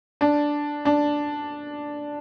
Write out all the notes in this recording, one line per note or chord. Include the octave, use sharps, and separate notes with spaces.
D4
D4